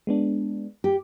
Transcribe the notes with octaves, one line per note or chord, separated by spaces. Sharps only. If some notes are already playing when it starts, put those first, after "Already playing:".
G#3 B3 D4
G4